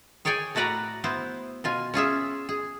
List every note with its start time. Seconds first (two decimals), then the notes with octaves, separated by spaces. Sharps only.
0.25 G#4 C#5 D5 G5 G#5
0.55 A2 A3 F#4 B4 D5 A#5
1.04 B3 E4 C5
1.64 B2 F4 G#5
1.94 C#4 F4 G#4 E5
2.49 G#4